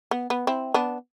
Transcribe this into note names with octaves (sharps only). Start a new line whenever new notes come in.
B3
B3
C4 E4
B3 D4